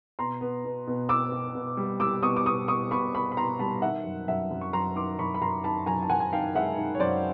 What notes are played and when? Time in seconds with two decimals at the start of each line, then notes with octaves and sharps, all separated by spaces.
0.19 B2 A#5 C6
0.41 B3
0.65 B2
0.87 B2
1.09 B3 D6 E6
1.32 B2
1.55 B2
1.77 G3
2.00 G3 D6 E6
2.23 B2 C#6 D#6
2.37 D6
2.45 B2 C#6 D#6
2.68 B2 C#6 D#6
2.91 B2 B5 C#6
3.14 B2 B5 C#6
3.32 B5
3.37 B2 A#5 C6
3.59 G3 A5 B5
3.82 D#3 E5 F#5
4.05 F#2
4.28 F#2 E5 F#5
4.51 F#2
4.61 C#6
4.73 F#2 A#5 C6
4.96 D#3 C6 D6
5.19 F#2 B5 C#6
5.34 B5
5.42 F#2 A#5 C6
5.64 D#3 A5 B5
5.86 F#2 G#5 A#5
6.02 A5
6.09 F#2 F#5 G#5
6.20 G#5
6.33 D#3 F5 G5
6.55 G#3 E5 F#5
6.77 D#3
6.95 C#5
7.00 F#2 C5 D5